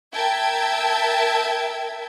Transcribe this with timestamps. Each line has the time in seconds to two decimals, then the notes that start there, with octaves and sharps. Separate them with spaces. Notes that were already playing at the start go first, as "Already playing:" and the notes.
0.13 A#4 E5 G5 A5 G#6